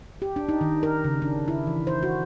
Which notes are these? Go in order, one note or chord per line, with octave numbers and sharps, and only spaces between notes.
G4
D4
D#4
D#3
A#4
C#3
D4
E4
E3
C5
F#4